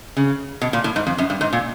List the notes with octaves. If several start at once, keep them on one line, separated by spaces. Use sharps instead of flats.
C#3
B2
A#2
A2
G#2
F2
F#2
G2
G#2
A#2